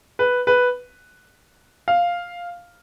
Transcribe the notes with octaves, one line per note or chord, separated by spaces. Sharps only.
B4
B4
F5